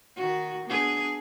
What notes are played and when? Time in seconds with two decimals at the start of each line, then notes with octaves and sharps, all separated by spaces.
0.16 D#3 F#4
0.65 B3 D4 G#4